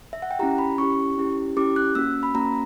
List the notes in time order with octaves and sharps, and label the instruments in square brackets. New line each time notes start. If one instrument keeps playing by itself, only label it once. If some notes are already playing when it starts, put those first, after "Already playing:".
[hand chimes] E5
F#5
G5
C#4 E4 G4 A#5
B5
C#4 E4 G4 C#6
C#4 E4 G4
C#4 E4 G4 D6
F#6
A#3 C#4 F#4 E6
B5
A#3 C#4 F#4 A#5